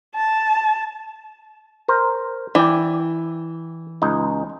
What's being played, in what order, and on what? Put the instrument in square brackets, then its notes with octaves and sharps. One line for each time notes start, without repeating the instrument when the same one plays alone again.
[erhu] A5
[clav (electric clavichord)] A#4 C5
[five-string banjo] E3 [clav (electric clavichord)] D5 G5
[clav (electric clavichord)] C#2 D#4